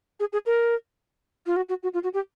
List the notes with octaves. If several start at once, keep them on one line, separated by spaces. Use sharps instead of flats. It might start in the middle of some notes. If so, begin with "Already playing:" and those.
G#4
G#4
A#4
F4
F#4
F#4
F#4
F4
F#4
G4